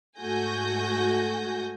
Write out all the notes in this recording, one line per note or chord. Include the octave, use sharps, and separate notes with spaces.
G#2 A3 F#4 G#5 G6 A#6